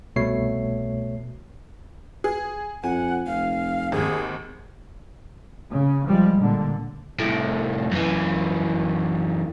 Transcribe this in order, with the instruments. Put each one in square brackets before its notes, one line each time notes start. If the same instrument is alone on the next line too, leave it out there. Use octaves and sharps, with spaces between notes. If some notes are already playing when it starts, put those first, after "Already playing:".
[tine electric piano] C2 B2 A3 C#5 C7
[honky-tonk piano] G#4
[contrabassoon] F2 [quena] F#5 [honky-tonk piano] G#5
[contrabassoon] F1 [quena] F5
[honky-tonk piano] G#1 D#2 [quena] G#4
[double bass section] C#3
F3 G3 G#3
A#2 D3
[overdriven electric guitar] C2 A2
F#2 E3